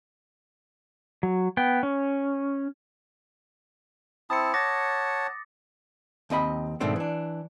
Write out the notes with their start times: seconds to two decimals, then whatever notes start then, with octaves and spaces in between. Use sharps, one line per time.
1.23 F#3
1.57 B3 G5
1.83 C#4
4.30 C4 E4 A5 D#6 C#7
4.54 C#5 F#5 A5 D6 A6 A#6
6.30 D#2 C4 D#5 B5
6.80 G#2 B2 D#3 A3 C4 D4
6.96 E3 D4